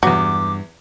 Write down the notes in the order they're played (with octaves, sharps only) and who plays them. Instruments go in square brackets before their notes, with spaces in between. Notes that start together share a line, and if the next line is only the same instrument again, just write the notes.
[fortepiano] E2 B3 [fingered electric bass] G2 [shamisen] F#3 [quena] D6